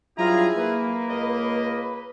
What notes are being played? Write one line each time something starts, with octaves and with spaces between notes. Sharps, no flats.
G2 F#3 E4 F4 G#4 A#5
A#3 B4
C#2 D#5